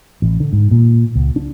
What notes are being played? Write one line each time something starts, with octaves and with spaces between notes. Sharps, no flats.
A1
D3
G#2
A#2
C#2
D4